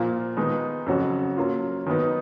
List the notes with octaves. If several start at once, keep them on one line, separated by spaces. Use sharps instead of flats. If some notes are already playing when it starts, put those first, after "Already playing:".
Already playing: A#2 F3 A#3 F4
D#3 G#3 B3 D#4
F2 C#3 F#3 C#4 F#4
F#3 A#3 C#4 F4
D#3 F#3 B3 D#4